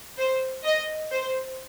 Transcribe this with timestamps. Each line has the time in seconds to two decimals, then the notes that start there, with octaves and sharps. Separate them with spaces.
0.18 C5
0.64 D#5
1.11 C5